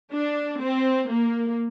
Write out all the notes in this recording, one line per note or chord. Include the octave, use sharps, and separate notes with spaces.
D4
C4
A#3